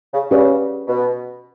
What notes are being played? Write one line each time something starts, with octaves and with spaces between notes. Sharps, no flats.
C#3
C#3 C#4 G4 B4 D5
B2